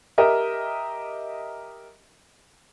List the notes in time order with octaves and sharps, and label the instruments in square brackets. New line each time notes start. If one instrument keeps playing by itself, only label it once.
[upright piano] G4 A#4 D#5 E5